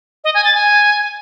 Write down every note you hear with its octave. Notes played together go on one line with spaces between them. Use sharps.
D#5
G#5
A6
G#5